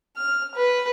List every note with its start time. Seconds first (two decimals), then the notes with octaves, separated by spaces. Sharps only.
0.17 F6
0.55 B4